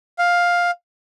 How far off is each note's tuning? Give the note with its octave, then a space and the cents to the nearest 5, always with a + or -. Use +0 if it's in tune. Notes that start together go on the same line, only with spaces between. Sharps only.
F5 +10